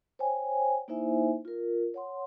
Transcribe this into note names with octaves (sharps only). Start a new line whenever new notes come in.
C5 C#5 G5 G#5
A#3 D#4 E4 C5 E5 G#5
F4 A#4
C#5 F#5 C6